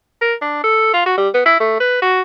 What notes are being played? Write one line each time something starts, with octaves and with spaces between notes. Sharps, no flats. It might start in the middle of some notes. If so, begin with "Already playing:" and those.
A#4
D4
A4
F4
F#4
G3
B3
E4
A3
B4
F#4